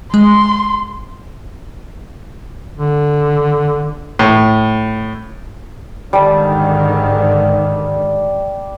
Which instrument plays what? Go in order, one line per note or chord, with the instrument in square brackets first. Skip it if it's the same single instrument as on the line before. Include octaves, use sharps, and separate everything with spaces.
[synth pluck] G#3 [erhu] C6
[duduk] D3
[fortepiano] A2
[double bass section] G#2 D3 D#3 [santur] G3 A5